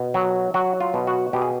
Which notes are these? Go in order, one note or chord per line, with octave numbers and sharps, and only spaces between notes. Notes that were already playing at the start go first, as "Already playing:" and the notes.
Already playing: B2
F#3
F#3 F#4
F4
B2
F#4
B2 G4
G#4